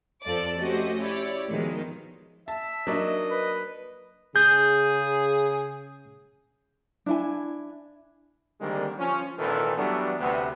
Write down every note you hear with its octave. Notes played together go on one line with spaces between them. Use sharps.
F2 F3 A4 D5 D6
A3 C#4 F#4 G4 C5 D#5
E4 G4 C#5 D5
B2 D#3 F3 G#3
E5 A5
F#3 A#3 D4 D#4 D#5
B4
C#3 G#4 G6
D4 E4 G#5
D3 D#3 G3 G#3 A#3 C4
F3 C#4
G#1 A#2 D#3 E3 A4 B4
E3 F#3 G3 A3 B3 D4
D2 C3 B3